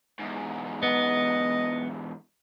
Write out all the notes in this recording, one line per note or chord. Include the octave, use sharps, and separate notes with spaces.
E2 G#2
B3 D#5